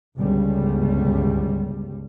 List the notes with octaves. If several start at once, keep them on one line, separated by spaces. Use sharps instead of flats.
G1 C#2 G3